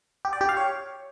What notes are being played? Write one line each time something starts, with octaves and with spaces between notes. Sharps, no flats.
G4
D5
G4
F5
C#5